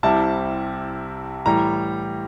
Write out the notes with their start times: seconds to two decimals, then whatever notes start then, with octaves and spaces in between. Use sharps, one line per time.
0.03 C2 C3 G3 C4 E4 A5
1.46 A2 E3 G3 A#5